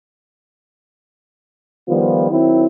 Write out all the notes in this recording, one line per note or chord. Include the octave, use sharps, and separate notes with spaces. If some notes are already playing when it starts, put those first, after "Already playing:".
D#3 F3 G3 B3 F4
D#3 F#3 C4 E4